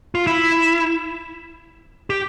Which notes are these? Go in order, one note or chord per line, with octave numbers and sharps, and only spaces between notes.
F4
E4
G4